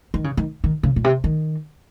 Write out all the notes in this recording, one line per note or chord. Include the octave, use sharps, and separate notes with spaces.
D#3
C#3
D#3
D#3
C#3
A#2
C3
D#3